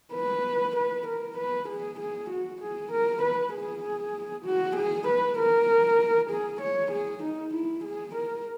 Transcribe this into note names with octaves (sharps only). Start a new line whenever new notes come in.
B4
B4
A#4
B4
G#4
G#4
F#4
G#4
A#4
B4
G#4
F#4
G#4
B4
A#4
G#4
C#5
G#4
D#4
E4
G#4
A#4